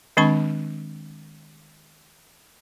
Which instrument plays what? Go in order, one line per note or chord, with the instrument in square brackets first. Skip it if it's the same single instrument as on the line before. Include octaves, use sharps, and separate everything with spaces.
[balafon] D#3 G#3 C4 D4 B5 C#6